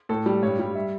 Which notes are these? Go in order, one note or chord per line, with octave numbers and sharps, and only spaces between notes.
A2 A4
G3
G2 C#5
G3
E5